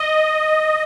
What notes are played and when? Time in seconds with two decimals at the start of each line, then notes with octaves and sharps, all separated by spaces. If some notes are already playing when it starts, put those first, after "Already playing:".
Already playing: D#5